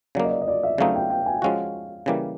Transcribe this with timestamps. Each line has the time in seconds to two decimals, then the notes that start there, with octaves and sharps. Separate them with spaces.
0.15 C#3 F#3 A#3 D5
0.25 D#5
0.31 D5
0.42 D#5
0.48 D5
0.63 E5
0.78 C#3 F#3 A3 C4 D#4 F5
0.95 G5
1.10 G5
1.26 G#5
1.42 F3 G#3 C#4 F#4 F5
2.06 C#3 E3 G3 A#3